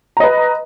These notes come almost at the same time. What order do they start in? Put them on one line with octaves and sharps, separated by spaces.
A#5 D#5 B4